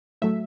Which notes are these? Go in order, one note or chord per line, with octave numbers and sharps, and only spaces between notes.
A2 F#3 A3 E5